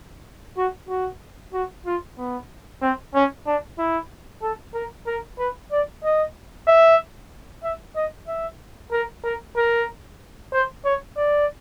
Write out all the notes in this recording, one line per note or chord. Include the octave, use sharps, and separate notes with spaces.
F#4
F#4
F#4
F4
B3
C4
C#4
D4
E4
A4
A#4
A#4
B4
D5
D#5
E5
E5
D#5
E5
A#4
A#4
A#4
C5
C#5
D5